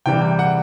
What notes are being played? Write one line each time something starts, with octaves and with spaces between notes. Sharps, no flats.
C3 E3 G3 G5
G5
F#5